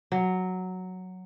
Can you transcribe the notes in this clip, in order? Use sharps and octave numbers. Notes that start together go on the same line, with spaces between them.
F#3